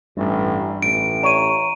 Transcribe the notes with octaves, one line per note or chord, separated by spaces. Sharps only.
A1 G2
A1 D7
C#5 A#5 D#7